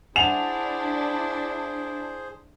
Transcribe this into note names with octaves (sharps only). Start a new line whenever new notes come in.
D4 E4 G#4 C5 F#5 G#5 F7